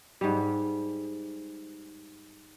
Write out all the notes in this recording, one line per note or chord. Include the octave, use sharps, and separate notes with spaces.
G#2 G3